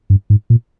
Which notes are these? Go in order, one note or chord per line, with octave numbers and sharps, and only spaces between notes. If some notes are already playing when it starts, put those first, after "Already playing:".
G2
G#2
A#2